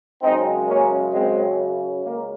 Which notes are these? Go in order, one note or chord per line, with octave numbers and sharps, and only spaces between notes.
F#2 C#3 G#3 C4 D#4
A#3 C#4
G#3 C4
C#2 C#3 A#3